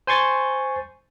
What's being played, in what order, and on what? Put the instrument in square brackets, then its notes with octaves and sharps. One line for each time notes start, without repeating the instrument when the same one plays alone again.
[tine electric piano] C5 G#5 C6 C#6 A6